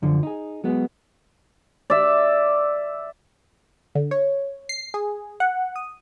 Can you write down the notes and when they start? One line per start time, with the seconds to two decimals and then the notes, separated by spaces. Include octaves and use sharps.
0.02 F#2 D3 F3
0.23 D#4 G#4
0.64 F#3 G#3 B3
1.90 D5 E5
3.95 D3
4.11 C#5
4.69 C7
4.94 G#4
5.40 F#5
5.76 D#6